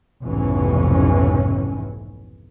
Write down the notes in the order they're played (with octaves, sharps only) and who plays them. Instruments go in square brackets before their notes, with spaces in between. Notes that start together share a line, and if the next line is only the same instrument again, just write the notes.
[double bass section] F1 B1 F2 G#2 E3 C#4